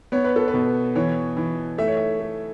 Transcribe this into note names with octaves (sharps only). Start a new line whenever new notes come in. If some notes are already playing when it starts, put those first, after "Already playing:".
B3 C#5
B4
A4
B4
B2
E3 C#5
E3
A3 E5
C#5
E5
A3